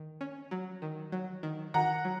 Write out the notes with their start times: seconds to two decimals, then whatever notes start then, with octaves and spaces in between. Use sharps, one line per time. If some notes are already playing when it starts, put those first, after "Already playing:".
Already playing: D#3
0.21 C#4
0.51 F#3
0.82 D#3
1.12 F#3
1.43 D#3
1.74 D#3 F#5 A#5
2.05 F#3